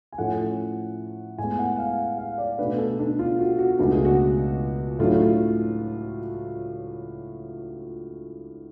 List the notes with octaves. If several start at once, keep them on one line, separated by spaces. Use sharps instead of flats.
G#5
A2 F3 A3 C#4 F#5
A2 G#3 B3 G#5
F#5
F5
F5
D5
B2 A3 D4 B4
A4
D4
F4
F#4
F#4
C#2 B2 A3 D4 F#4
G#4
F#4
A2 F#3 A3 D4 F4